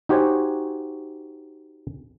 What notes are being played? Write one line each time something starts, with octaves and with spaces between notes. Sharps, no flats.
D#4 F#4 G4 C5 C#5 G#5